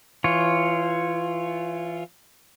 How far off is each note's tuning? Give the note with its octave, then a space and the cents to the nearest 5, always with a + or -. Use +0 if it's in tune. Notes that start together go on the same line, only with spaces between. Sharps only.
E3 +20 F4 +0 C#5 +0